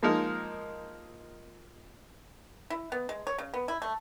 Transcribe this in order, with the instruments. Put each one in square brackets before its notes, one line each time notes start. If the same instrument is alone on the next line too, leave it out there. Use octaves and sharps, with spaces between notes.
[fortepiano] F3 G#3 A#3 D#4 A#4
[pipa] E4
B3
G#3
C#5
C#3
B3
E4
A3